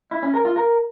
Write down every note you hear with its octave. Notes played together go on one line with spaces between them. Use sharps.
E4
C#4
A#4
F4
A#4